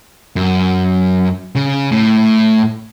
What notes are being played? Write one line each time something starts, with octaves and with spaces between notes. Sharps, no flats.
F#2
C#3
A2